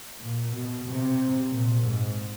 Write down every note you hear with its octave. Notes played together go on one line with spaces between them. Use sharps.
A#2
B2
C3
A#2
G#2